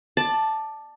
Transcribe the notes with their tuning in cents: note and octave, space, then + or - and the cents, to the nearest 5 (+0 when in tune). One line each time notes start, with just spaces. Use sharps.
D5 +20 A5 +0